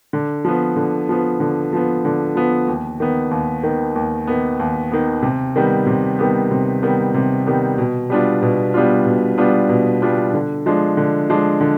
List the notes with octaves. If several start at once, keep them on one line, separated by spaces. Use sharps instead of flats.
D3
F3 B3
D3
F3 B3
D3
F3 B3
D3
F3 B3
D#2
D#3 B3
D#2
D#3 B3
D#2
D#3 B3
D#2
D#3 B3
C3
D#3 G3 B3
C3
D#3 G3 B3
C3
D#3 G3 B3
C3
D#3 G3 B3
B2
G3 B3 D4 F4
B2
G3 B3 D4 F4
B2
G3 B3 D4 F4
B2
G3 B3 D4 F4
D3
F3 G#3 D4
D3
F3 G#3 D4
D3